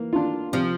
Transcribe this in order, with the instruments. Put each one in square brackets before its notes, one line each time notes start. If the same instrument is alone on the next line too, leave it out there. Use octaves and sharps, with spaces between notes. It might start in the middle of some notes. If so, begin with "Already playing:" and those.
Already playing: [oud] E3 [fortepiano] A#3
[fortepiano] D4 F4
[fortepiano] C3 [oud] F3